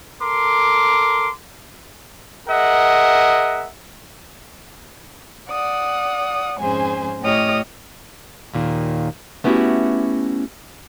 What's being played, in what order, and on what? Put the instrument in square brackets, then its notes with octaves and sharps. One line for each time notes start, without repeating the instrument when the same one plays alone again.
[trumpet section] A4 A#4 C6 D6
G#4 A#4 D#5 E5 F#5
[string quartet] D5 F#5 D#6
F2 G#2 C#4 G#4 C5 G#5
A2 G4 C#5 D#5 D#6 F6
[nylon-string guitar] D#2 A#2 D#3
A3 B3 C#4 E4 F#4 G4